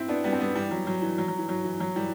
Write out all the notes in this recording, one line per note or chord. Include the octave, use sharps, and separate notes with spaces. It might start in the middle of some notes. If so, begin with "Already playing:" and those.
Already playing: C4 E4
B3 D4
G3 B3
C4
G3 B3
E3 G3
F#3
F#3
E3
F#3
F#3
E3
F#3
E3
F#3
E3 G3